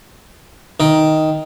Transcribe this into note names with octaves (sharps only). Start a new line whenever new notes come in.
D#3